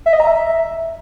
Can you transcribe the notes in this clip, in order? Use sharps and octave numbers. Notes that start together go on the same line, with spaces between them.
E5
D#5
A#5
E5